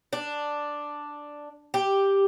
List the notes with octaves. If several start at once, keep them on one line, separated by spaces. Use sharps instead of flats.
D4
G4